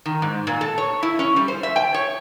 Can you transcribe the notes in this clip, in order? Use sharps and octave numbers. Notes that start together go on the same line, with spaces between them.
D#3
G#2
A#2
A4
C#5
E4
C#4
G3
C5
E5
G5
C#5